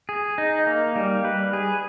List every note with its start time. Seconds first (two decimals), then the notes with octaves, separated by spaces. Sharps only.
0.09 G#4
0.38 D#4
0.67 A#3
0.96 G3
1.25 B4
1.53 G#4